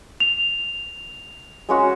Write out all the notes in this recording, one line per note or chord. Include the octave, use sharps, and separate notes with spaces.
F7
G#3 C#4 F#4